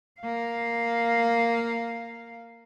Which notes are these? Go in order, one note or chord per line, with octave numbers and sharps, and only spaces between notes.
A#3 F5